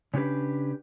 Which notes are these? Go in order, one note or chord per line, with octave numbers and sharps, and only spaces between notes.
C#3 C#4 D4 G4 B4